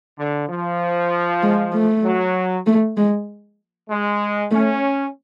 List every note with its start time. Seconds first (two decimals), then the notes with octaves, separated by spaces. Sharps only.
0.19 D3
0.49 F3
1.42 G#3
1.73 A3
2.04 F#3
2.67 A3
2.97 G#3
3.90 G#3
4.51 A3 C#4